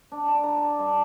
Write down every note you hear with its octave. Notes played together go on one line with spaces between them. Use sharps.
D4
D4
A#5
A5
G2